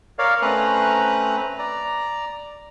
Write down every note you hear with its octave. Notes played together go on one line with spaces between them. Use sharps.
A#4 C#5 D5 F5
A3 C4 C#4 B4 A#5 F#6
D5 A#5